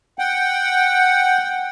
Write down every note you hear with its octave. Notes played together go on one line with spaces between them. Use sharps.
F#5 G5